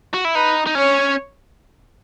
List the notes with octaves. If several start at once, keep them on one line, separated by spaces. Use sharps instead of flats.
F#4
E4
D#4 B4
D#4
C#4 C#5